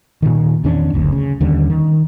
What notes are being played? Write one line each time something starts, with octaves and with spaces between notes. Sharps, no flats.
A#2 D#3
E2 D#3 C#4 D4
F#1 D2
C#3
D#2 D3 G3 C#4
D#3